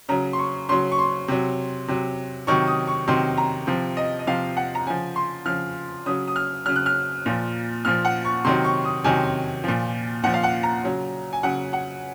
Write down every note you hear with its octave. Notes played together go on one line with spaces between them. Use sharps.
C#3 F#3 A#5
C6
C#6
C#3 F#3 C6
C#6
C6
C3 F#3
C3 F#3
C3 D#3 F#3 C#6
D#6
C#6
C3 D#3 F#3 C6
A#5
C3 F3
D#5
D#5
C3 F3 F5
F#5
A#5
C#3 F3 G#5
C6
C#3 F3 F6
C#3 F#3 D#6
D#6
F6
C#3 F#3 F6
F#6
F6
A#2 F3
A#2 F3 F6
F#5
C#6
C3 D#3 F#3 C6
C#6
D#6
C3 D#3 F#3 G#5
A#2 F3
A#2 F3 F#5
F5
F#5
A#5
C#3 F#3
G#5
C#3 F#3 F#5
F#5